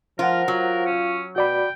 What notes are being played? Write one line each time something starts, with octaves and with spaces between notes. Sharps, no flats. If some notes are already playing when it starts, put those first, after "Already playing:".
F3 F4 A#4 C5 F#5
F#3 F4
C#4
B2 F#4 D5 G5 B5